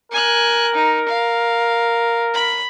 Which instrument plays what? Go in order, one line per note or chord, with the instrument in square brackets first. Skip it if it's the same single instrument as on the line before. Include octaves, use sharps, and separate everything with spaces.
[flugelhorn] A#4 [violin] G#5 F#6
[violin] D#4
F5
B5